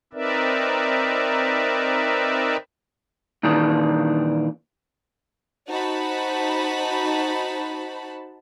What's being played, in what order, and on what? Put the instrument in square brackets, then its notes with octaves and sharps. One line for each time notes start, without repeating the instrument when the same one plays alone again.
[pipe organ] C4 D#4 A#4 B4 D5 E5
[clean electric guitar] A#2 D#3 E3 D4 G#4
[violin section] D#4 F#4 C5 A5 B5